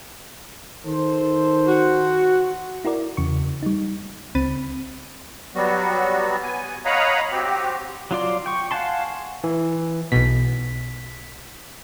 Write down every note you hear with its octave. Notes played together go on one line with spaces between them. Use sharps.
D#3 A4 C5
F#4
E4 F#4 A#4 D5
E2 C#3 C#6
G3 D#4
C#2 C4 B5 A6 D#7
F#3 G3 B3 F#4
B3 G#5
C#5 D#5 F5 F#5 A#5 B5
C4 F#4 G4
F#3 F4 D5 C6
G5 C#6
F5 F#5 G#5 A5 C6
E3
B1 B2 B6